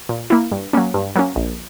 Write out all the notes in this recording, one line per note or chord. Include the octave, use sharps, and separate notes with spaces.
A#2
A#3 E4
G2
F#3 A#3 C#4
G2
F#3 A#3 C#4
A#1